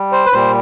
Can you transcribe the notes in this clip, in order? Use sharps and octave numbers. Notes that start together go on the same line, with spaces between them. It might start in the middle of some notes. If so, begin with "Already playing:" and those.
Already playing: G3
C5
B4
A#2 G3 C5